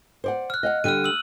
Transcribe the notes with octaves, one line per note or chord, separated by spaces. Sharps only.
C5 D5 F#5
F6 F#6
D#5 F5 F#5
D3 G3 F6 F#6 D#7
E6 F#7